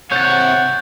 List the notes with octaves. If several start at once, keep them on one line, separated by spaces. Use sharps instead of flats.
C3 C#5 F#5 G6 A6